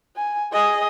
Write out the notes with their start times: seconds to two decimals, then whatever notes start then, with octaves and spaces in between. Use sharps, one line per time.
0.16 G#5
0.52 G#4 D#5